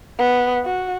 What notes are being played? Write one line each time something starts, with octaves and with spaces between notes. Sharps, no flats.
B3
F#4